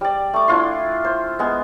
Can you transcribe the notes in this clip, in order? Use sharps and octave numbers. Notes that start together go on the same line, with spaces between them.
G3 D5
A3 D6
D4 E4 F4 C6
C5
G#3 B3 G#4